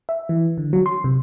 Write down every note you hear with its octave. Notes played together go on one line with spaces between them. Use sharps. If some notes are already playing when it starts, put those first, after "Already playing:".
E5
E3
D3
F#3
C6
C3